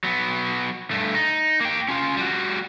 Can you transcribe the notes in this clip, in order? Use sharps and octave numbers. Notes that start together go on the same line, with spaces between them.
F#3 B3
G2 A3
D#4
A#3 G5
C#4 F4
G3 F#4